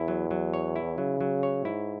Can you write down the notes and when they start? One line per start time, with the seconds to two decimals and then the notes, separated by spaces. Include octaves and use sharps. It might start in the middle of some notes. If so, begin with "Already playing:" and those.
Already playing: E2 E4
0.08 F#3
0.31 F#3
0.54 C#5
0.76 E4
0.98 C#3 F#3
1.21 F#3
1.43 C#5
1.65 G#2 E4